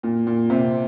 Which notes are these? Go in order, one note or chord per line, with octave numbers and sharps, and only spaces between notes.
A#2
A#2
C3